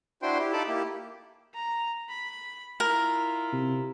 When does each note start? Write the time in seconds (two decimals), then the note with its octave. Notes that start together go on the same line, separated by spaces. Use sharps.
0.22 D4 E4 F#4 C5 G5 C6
0.39 E4 G4
0.53 D#4 F4 A4 A5 B5 D6
0.68 A#3 E4 G4
1.54 A#5
2.09 B5
2.80 E4 F4 A#4
3.53 C3